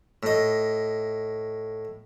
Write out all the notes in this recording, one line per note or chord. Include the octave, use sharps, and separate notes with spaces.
A2 D#5